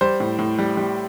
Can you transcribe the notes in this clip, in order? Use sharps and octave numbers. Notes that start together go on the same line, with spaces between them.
G3 C5
A2
A2
G3
G3